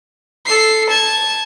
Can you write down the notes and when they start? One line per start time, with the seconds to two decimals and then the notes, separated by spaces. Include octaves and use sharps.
0.46 A4 C7
0.89 A5 G#6